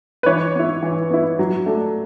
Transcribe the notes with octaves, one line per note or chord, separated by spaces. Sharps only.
B4
E3 C#5
B3 E4
E3
B3 E4
F#3
A3 D4